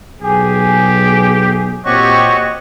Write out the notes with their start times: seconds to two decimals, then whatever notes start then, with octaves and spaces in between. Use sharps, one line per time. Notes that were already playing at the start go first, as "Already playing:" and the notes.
0.22 B1 G4 G#4
1.85 A#2 C4 F#4 G4 C#5 D#5 C#6